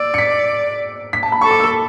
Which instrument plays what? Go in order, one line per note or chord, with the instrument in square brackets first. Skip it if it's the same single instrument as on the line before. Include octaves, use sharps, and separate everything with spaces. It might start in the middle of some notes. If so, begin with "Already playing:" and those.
Already playing: [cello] D5 [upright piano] E6
[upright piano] C#7
B6
B6
A5
B5
[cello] A4 [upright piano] C#6
[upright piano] D6
E6